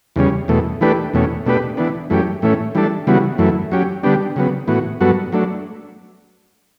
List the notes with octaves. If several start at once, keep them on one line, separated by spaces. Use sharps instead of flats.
E2 C#3 G3 C#4
E2 B2 A3
E3 A3 D4 G4 B4
E2 B2 A3 C#4
B2 A3 D4 G4 B4
E3 B3 D4
F#2 E3 A3 C#4 G4
A2 E3 A3 C#4
E3 G3 D4 A4
C#3 E3 G3 B3 F#4
F#2 E3 A3
F#3 C#4 G4
D3 G3 B3 D4 G4
C#3 F#3 B3
A2 E3 B3 F#4
G2 F#3 B3 F#4 A4
F#3 A3 D4